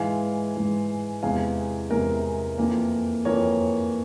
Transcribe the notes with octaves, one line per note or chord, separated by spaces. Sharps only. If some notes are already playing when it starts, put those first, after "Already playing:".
Already playing: G#2 E3 G#3 F5 G#5
G#2 E3 G#3
E2 C3 E3 G#3 F5 G#5
E2 C3 E3 G#3 A#4
F2 E3 A#3
F2 E3 A#3 A#4 C#5